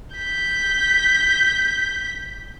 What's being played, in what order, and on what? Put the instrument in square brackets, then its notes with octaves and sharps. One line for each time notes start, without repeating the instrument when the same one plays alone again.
[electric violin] G6 B6